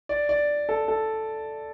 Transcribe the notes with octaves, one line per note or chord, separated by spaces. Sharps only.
D5
D5
A4
A4